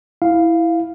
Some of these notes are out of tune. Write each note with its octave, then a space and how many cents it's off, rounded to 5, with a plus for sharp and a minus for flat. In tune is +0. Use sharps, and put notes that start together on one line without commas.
E4 +0 F5 +0